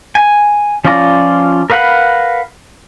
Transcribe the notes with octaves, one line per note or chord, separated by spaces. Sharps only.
G#5
F3 C#4 F4 D5 A#5
A#4 B4 F5 F#5 B5